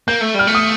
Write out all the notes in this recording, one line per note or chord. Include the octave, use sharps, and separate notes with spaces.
A#3 G6
A3
G3 F6
A3
D#6